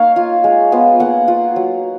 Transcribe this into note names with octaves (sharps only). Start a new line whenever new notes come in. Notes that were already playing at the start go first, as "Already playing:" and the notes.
Already playing: A#3 D#4 C#5 F5
F4
G#3
B3 F4
A#3 F#5
F4
F#3